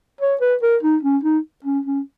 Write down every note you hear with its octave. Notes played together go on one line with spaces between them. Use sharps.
C#5
B4
A#4
D#4
C#4
D#4
C#4
C#4